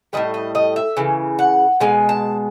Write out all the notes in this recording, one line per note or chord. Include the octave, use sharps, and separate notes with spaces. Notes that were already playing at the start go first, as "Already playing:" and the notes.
A2 E3 G3 D#5
D#5
D#5
E5
C#3 E3
F#5
B2 G#3 G#5
A5